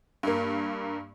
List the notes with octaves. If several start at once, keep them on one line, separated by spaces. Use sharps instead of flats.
G2 A#3